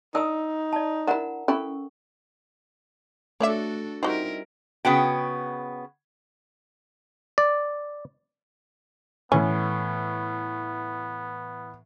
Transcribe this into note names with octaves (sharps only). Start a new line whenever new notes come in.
D4 D#4 D#6 E6
D5 A5
D4 E4 A#4 F#5 A#5
C#4 E4 A4 C#6
A3 D4 F#4 A4 C#5 D5 E5
G3 C4 D#4 E4 F#4 G4 A#4
C#3 B3 F#4 G5
D5
A2 E3 B3 C#4